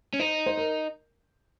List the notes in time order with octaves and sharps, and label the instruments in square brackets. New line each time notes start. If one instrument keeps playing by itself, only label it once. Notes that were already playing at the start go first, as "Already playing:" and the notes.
[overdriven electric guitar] C#4
[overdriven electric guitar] D#4 [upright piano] C5
[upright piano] C5
A#4